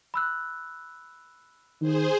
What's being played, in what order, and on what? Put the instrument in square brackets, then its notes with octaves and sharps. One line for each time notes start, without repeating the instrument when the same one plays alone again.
[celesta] B5 E6 F#6
[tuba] D#3 [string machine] G#4 C5